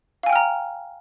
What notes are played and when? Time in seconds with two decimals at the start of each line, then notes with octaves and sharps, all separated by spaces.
0.23 F5
0.26 G#5
0.29 G5
0.32 F6
0.36 A#5